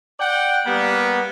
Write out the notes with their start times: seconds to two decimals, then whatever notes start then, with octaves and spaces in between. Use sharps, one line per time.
0.20 D5 F#5 G5
0.65 G3 A#3 B3